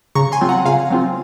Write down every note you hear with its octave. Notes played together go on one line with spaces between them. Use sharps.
C#3 A#5 C#6
G#5 C6
F#3 C4 F4
F#5 A#5
C#3 F5 G#5
F#3 C4 F4